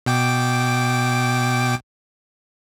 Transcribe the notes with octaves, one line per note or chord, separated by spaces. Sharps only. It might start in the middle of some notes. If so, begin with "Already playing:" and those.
B2 G5 D6